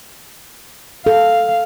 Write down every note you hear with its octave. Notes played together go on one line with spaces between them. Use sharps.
A4 F5